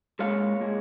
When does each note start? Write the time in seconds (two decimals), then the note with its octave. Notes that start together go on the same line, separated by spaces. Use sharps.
0.20 A#2 G#3 C#5 F5
0.60 A#2 G#3